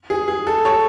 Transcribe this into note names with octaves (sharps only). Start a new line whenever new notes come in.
G#4
G#4
A4
A4 C#5